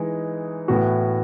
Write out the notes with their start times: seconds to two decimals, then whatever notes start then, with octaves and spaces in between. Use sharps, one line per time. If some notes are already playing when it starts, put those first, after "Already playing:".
Already playing: E3 G#3 D#4
0.68 A2 E3 B3 F#4